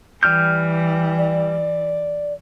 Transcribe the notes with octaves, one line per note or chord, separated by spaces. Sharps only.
E3 G3 F6 G6
D5